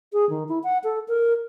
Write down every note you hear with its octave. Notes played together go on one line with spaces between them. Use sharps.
G#4
D#3
E4
F#5
A4
A#4